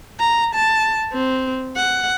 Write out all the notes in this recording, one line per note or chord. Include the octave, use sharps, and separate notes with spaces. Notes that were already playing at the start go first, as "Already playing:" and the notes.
A#5
A5
C4
F#5